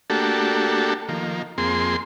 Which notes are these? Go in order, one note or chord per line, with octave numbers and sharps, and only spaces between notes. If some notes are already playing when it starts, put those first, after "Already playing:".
A3 A#3 D4 F#4 G4 A4
D#3 F3 A#3
F2 A#3 C4 G#4 C6